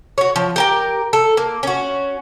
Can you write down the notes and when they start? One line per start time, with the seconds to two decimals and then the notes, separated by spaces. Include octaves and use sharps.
0.18 F#4 C#5
0.36 F3
0.56 G4 A#4 G5
1.13 A4
1.37 A#3
1.63 C#4 F#4